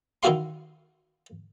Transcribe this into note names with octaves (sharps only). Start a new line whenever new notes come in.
D#3 D#4 E4 F#4 F5 C6